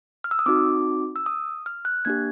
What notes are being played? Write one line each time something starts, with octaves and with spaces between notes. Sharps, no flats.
F6
E6
D#6
C4 D#4 F#4 D6
E6
D#6
F6
F#6
A#3 D4 G4 G#6